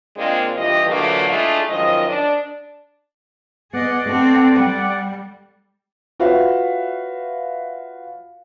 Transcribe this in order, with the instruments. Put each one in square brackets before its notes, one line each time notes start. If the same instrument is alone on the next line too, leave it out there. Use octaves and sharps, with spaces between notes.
[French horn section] A#2 G#3 A#3 C4 D4 F4
G2 E3 F4 G4 D#5
A#2 D3 E3 F#3 A3 A#3
G#3 A3 D4 E4 F4 G#4
F#2 D#3 F3 G#3 D#5
D4 D5
[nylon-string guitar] B3 [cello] G#4 D#5 [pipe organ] D5 F#5
[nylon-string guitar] A3 A4 [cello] C4
[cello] G3 [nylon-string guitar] G5
[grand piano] F4 F#4 B4 C#5 E5 F5